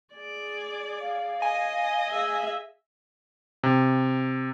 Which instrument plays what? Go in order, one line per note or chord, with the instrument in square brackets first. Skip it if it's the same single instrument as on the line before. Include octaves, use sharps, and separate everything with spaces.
[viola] G#4 D5
[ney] F5
[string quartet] D#5 [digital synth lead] G#5
[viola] G#4 E5
[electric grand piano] C3